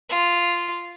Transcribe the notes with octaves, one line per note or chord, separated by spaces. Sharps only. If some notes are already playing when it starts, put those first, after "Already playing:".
F4